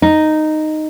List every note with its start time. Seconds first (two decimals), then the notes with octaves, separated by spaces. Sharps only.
0.02 D#4